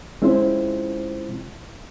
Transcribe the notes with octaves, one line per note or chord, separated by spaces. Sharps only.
G#3 C4 C#4 E4 F4 C5